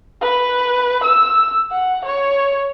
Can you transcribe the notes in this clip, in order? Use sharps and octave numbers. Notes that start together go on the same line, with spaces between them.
B4
E6
F#5
C#5